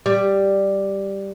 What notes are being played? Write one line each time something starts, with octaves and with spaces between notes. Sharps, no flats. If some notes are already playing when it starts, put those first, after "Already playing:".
G3